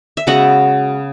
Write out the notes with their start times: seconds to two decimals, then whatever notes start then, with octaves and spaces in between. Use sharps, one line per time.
0.17 E5
0.27 C#3 G#3 B3 F#4 F#5